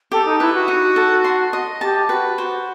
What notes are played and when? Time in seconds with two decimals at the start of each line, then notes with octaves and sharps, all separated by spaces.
0.12 G4 A4
0.25 D#4
0.40 E4 B4
0.54 F#4
0.68 D#4
0.96 A4
1.24 C6
1.53 D#5
1.81 G4 A5
2.09 F#4 B4
2.38 F#4 C5